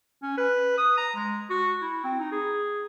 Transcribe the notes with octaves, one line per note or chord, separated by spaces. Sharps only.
C#4
B4
D#6
A#5
G#3
F#4
E4
C4
D#4
G#4